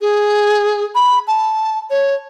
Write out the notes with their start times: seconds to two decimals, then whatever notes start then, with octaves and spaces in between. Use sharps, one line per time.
0.01 G#4
0.95 B5
1.28 A5
1.90 C#5